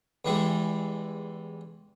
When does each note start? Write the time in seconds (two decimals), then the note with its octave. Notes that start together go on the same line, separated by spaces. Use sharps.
0.25 E2 E3 G3 G#3